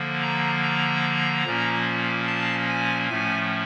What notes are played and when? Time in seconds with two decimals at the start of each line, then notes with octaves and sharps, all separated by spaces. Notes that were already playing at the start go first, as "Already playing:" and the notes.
Already playing: D3 F3 A#3
0.22 A#5
0.63 A#5
1.46 A#2 F3 A#3 C#4
2.27 A5
2.69 G#5
3.10 A2 F3 A3 C#4 G#5